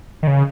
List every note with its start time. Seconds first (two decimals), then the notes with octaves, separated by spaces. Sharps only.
0.23 D#3
0.27 C#3